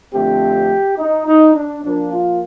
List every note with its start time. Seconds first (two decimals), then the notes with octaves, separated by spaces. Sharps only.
0.14 F2 D3 A3 C4 G4
0.98 D#4
1.26 D#4
1.54 D4
1.83 A#2 F3 A#3 D4
2.11 F4